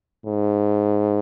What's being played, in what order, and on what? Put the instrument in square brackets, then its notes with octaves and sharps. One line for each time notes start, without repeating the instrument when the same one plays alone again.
[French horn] G#2